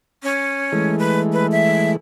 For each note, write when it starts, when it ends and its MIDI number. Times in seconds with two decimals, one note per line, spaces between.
0.23 0.95 61
0.72 1.97 52
0.72 1.97 56
0.72 1.97 57
0.99 1.20 71
1.33 1.47 71
1.52 1.91 76